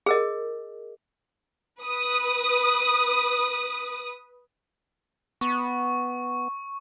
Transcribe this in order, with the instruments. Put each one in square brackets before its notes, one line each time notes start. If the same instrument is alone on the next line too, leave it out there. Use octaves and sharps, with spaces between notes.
[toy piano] G#4 A#4 D#5
[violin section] B4 D#6
[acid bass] B3 [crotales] C#6